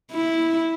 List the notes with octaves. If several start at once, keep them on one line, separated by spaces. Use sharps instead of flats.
E4